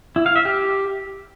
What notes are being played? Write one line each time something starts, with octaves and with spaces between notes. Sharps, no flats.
E4
F5
E5
G4